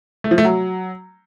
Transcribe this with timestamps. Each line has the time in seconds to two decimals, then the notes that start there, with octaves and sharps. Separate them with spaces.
0.24 A3
0.31 F3
0.38 A3
0.45 F#3